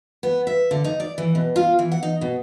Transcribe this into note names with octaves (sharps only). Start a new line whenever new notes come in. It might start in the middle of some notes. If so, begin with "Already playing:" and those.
B3
E5
D3
D#4
D5
E3
B2
F4
E3
F#5
D#4
B2